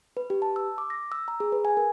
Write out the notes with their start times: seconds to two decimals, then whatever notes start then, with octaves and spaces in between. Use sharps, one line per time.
0.17 B4
0.30 G4
0.42 A5
0.56 E6
0.78 D6
0.90 A#6
1.12 E6
1.28 A#5
1.40 G#4
1.52 B4
1.65 G#5
1.77 A#4